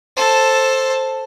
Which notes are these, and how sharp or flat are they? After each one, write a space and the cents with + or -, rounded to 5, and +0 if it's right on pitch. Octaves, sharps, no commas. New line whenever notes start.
A4 +0 C5 +10